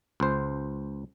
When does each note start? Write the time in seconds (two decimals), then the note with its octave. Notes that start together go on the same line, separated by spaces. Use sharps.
0.20 C#2 C5